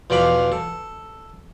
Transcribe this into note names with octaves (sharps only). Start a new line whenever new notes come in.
E2 B2 F3 D5 F5 B5
A4